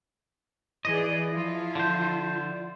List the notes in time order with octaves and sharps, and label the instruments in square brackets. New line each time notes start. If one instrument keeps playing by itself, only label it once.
[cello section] E3 G#4 D5 [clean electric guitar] D#5
[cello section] F3 E4 F4
[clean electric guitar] D3 C5